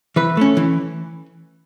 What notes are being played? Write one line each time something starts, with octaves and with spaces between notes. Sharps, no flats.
E3 B4
A3 C#4
E3